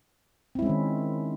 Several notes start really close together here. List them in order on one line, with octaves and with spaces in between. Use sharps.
C4 E4 G#3 C#4 D#3